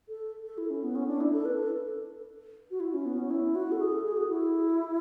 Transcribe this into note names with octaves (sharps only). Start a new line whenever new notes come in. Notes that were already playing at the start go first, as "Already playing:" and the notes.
A4
A4
E4
C#4
B3
C#4
D4
E4
A4
B4
A4
F#4
E4
C#4
B3
C#4
E4
F#4
A4
G#4
A4
G#4
F#4
E4